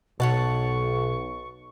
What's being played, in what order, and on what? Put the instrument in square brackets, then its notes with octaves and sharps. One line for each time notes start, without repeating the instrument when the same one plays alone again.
[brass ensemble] B1 [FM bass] B2 [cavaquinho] C#5 F#5 A5 [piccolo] C#6